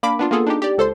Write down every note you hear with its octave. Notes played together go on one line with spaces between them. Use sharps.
A#3 D4 B5 D6
B3 D4 F4
A#3 B3 F4 G#4 A4
D4 D#4 G4
G4 D5
C#2 A4 C5 C6